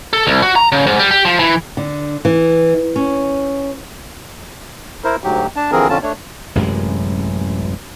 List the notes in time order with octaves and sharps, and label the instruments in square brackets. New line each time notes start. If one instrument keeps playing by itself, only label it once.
[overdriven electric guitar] A4
C2
F#4
A#5
C#3
G#2
G3
G4
F3
E3
[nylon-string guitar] D3
E3
C#4
[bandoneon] E4 A#4 C5
D2 G#2 F#3 G4
D4 A5
D3 E3 F3 C4 G#4 A#4
F2 D3 C#4 F4 A5
A3 D4 C#5
[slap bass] A1 F#2 C3 G#3